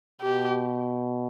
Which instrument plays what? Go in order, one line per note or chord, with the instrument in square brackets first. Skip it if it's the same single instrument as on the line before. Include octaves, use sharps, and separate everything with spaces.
[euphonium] B2 [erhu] G4